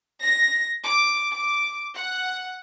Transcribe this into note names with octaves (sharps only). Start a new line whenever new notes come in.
A#6
D6
D6
F#5